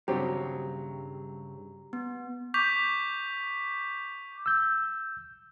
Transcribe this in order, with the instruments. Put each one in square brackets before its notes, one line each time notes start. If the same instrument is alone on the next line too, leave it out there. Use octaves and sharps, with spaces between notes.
[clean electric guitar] G2 C#3 [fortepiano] F#3 C4 [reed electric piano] G4 [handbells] A#5
[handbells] B3
[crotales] C#6 D6 G6 B6 F7
[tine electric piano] E6 G6